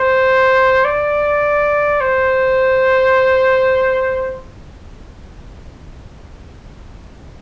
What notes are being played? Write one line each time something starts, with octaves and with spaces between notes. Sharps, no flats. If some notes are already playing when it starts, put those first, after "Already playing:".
Already playing: C5
D5
C5